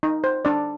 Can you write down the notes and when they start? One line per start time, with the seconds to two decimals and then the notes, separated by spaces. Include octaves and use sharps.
0.03 D#4
0.24 C5
0.45 D4 D5